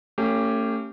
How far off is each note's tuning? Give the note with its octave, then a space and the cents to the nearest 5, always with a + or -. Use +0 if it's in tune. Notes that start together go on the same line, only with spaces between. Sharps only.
A3 +40 C#4 +0 G4 +0